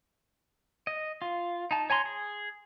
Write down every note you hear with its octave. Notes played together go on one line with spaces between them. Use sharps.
D#5
F4
D#4 A5
C#5 G#5 A#5 C6
G#4